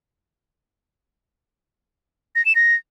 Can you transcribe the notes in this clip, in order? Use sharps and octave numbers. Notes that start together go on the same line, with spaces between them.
A#6
E7
A#6